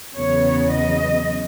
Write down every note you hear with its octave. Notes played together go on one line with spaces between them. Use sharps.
E2 C#3 F#3 B3 C#5
D#5